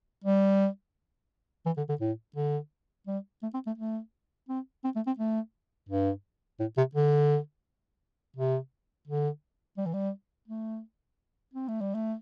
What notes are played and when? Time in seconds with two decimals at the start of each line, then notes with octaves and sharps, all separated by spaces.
0.24 G3
1.66 E3
1.77 D3
1.89 D3
2.01 A2
2.36 D3
3.07 G3
3.43 A3
3.54 C4
3.66 A3
3.78 A3
4.49 C4
4.84 C4
4.96 A3
5.07 C4
5.18 A3
5.89 G2
6.60 A2
6.77 C3
6.95 D3
8.36 C3
9.08 D3
9.77 G3
9.86 E3
9.93 G3
10.48 A3
11.54 C4
11.68 A3
11.81 G3
11.94 A3